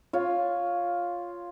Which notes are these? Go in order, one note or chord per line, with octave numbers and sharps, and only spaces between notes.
F4 C#5